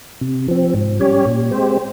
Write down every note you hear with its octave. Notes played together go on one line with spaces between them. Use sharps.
C3
F3 C4
G#2
G3 C#4 G4 C#5
A#2
G#3 C4 G4 C5